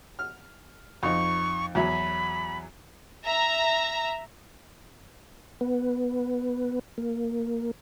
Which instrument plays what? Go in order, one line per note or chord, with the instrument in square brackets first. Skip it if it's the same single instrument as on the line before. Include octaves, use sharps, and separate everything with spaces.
[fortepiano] F6
[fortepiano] F2 D#4 [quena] C#6
[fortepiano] E2 F#3 E4 [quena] B5
[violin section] E5 A#5
[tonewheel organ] B3
A#3